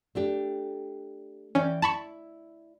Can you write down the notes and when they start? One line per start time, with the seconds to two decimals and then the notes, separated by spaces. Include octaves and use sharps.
0.15 A3 D4 G4
1.55 E3 C#4 D5 G5
1.82 E4 A5 B5 C#6